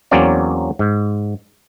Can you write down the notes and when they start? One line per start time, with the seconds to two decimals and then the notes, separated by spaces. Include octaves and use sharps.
0.11 E2 F#3 A#3 C4 C#4 D5
0.79 G#2